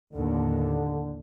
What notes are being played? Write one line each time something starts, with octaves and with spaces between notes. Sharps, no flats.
A1 D#2 D3